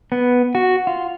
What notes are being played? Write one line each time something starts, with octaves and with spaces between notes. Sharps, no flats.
B3
F#4
F4